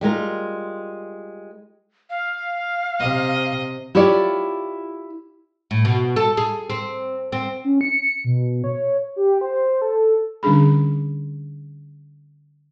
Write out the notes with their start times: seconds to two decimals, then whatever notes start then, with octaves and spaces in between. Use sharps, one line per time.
0.01 G3 G#3 F4 A#4
2.10 F5
3.00 C3 D#5
3.95 E4 F4 G4 C#5 D5
5.71 A2
5.85 B2
6.16 A4
6.37 G#4
6.70 C4
7.32 C4
7.64 C#4
7.81 C#7
8.24 B2
8.64 C#5
9.16 G4
9.41 C5
9.82 A4
10.43 D3 G3 C#4 D4 G#4 B5